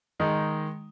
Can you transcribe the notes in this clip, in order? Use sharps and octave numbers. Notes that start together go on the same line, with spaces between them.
D#3 G#3 D#4